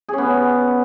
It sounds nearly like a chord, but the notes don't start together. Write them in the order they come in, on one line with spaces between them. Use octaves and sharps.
G#4 C#4 B3